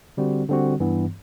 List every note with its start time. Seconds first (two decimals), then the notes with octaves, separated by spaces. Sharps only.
0.17 D3 G3 C4 F#4
0.49 D3 G3 C4 F#4
0.80 G2 E3 B3